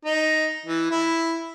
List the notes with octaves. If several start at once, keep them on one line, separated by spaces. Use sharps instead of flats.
D#4
E3
E4